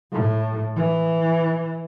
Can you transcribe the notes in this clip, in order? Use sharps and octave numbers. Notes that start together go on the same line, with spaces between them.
A2
E3